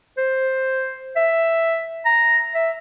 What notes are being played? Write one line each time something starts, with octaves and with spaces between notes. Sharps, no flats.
C5
E5
A#5
E5